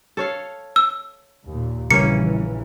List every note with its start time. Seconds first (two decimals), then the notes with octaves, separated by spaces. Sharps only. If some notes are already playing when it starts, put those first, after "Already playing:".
0.17 A4 C#5 F5
0.76 E6
1.45 D#2 A#2
1.91 A#1 C#3 E3 G3 A#3 C#4 C#7